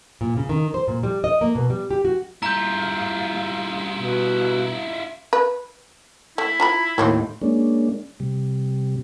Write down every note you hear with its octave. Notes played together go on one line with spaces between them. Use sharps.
A#2
C#3
D#3
C5
A#2
G3
D#5
A#3
B2
G3
G4
F#4
G3 E4 F4 A#5 G6
B2
B4
A3 E4
F4 A#5 B5
D#2 A2 F#3 A#3 C4
G#3 A#3 C#4 D4
C3 G3